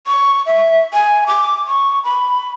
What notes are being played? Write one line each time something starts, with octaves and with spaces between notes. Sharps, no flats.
C#6
E5
G#5
D6
C#6
B5